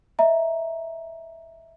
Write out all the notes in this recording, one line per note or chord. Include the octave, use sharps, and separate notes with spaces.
D#5 E5 A#5